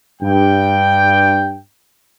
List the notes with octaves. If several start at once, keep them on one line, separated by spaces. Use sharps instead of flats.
G2 G5